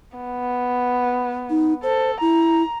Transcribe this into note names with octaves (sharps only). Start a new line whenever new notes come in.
B3
D#4
A4 C5
E4 A#5